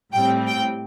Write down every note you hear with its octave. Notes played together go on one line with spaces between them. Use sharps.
A2 G3 C4 G5
G5